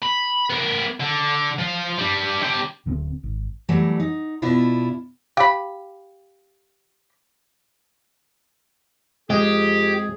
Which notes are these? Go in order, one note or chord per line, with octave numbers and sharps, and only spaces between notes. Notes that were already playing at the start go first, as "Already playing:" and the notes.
B5
B3 A#4
D3
F3 F4
G3 D4
D3 G4
D1 D3 B3 C4
G#1
E3 F#3 G3 A3
D#4
B2 D4 E4 F4
G4 F5 B5
F2 G#3 G4 G#4